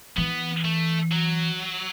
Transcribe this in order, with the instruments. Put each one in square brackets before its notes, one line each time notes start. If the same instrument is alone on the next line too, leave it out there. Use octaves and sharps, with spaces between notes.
[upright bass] E3 [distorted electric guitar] B3
[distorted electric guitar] A3
F#3